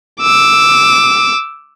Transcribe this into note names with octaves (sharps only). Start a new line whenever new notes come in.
D6 E6